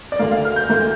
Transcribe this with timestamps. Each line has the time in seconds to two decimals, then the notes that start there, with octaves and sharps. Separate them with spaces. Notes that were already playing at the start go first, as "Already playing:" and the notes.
0.12 D5
0.19 D2 D3 A#3 F5
0.32 F5
0.45 F6
0.56 G6
0.69 D2 D3 A#3